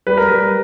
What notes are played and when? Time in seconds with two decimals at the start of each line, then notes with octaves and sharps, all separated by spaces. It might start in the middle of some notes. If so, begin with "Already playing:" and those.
0.07 G3 B4
0.18 A#4
0.28 G3 B4